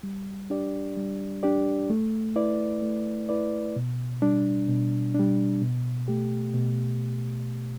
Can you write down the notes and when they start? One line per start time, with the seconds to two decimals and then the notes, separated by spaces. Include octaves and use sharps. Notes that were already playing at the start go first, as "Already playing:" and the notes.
0.03 G3
0.50 D4 G4 D5
0.97 G3
1.43 D4 G4 D5
1.90 A3
2.36 E4 B4 D5
2.82 A3
3.29 E4 B4 D5
3.76 B2
4.22 G3 D4
4.68 B2
5.14 D4
5.20 G3
5.62 B2
6.08 A3 G4
6.54 B2